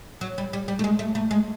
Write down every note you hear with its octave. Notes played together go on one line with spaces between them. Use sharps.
F#3
G3
G3
G3
A3
G#3
A3
A3
G#3